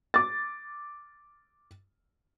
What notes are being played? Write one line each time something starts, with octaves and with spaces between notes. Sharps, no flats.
D6 A6